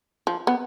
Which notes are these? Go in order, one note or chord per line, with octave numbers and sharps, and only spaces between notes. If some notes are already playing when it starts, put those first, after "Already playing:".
F3
B3